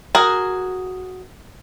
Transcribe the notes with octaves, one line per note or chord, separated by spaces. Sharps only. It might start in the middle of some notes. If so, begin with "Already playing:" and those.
F#4 G#4 A#4